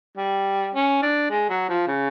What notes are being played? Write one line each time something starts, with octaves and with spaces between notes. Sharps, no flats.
G3
C#4
D4
G#3
F#3
F3
C#3